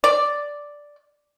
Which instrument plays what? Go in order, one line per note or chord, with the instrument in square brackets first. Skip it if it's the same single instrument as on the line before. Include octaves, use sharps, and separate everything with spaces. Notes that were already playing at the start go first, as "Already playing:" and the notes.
[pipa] D5